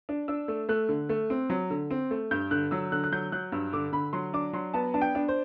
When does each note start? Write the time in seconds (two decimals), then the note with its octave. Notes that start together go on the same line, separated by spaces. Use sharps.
0.09 D4
0.28 D4 E6
0.48 A3
0.69 A3 F#6
0.89 D3
1.09 A3
1.30 C4
1.50 F#3
1.70 D3
1.91 C4
2.11 A3
2.31 G2 G6
2.51 D3 F#6
2.71 F#3 E6
2.92 D3 F#6
3.04 F#6
3.12 F#3 G6
3.32 F#3 F#6
3.52 G2 E6
3.73 D3 D6
3.93 D3 B5
4.13 F#3 C6
4.33 D4 D6
4.53 F#3 C6
4.74 B3 A5
4.94 D4 A5
5.01 G5
5.15 D4
5.28 C5